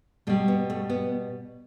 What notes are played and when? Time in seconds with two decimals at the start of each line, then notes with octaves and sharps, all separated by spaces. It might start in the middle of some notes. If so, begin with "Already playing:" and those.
0.27 B2 G3 A3
0.48 B3
0.70 A3
0.90 B3